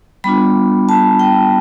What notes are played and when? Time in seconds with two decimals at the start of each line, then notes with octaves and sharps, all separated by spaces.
0.24 G3 B3 D4 F4 B5
0.89 A5
1.19 G5